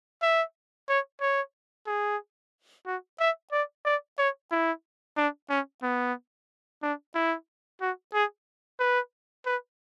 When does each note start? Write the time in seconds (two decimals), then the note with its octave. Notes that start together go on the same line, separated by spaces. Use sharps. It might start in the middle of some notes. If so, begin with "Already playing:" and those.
0.22 E5
0.89 C#5
1.21 C#5
1.87 G#4
2.87 F#4
3.20 E5
3.52 D5
3.85 D5
4.19 C#5
4.52 E4
5.17 D4
5.50 C#4
5.83 B3
6.83 D4
7.15 E4
7.81 F#4
8.14 G#4
8.80 B4
9.46 B4